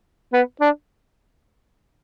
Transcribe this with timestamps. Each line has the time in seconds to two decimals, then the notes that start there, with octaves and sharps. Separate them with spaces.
0.33 B3
0.61 D4